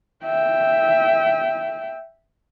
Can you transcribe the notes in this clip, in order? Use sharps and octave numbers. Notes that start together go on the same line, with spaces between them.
E5 G5